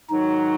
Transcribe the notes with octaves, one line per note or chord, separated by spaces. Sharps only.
G#2 D#3 F#3 D#4